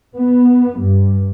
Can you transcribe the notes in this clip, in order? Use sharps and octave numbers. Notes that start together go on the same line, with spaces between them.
B3
G2